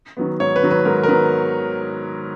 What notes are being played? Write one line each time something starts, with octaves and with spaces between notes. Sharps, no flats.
D#3 F#3 B3
G#2 C#5
B4
D#3 F#3 B3
B4
G#2 A#4
A#4
D#3 F#3 B3 B4